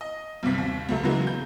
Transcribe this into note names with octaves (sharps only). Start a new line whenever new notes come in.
D#5
B1 G2 C3 B6
D#2
C#2 F#3 A3
C#3 E3 F#3 G#3 A#3 B3
G6